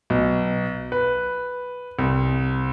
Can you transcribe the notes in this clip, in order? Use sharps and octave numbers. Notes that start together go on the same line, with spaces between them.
B1
B4
C2